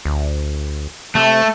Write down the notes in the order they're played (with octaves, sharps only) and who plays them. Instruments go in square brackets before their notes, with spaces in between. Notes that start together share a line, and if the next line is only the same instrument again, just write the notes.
[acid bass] D2
[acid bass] C3 [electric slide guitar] A3